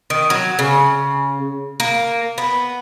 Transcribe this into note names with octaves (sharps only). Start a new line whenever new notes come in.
D#3
F#3
C#3
A#3
B3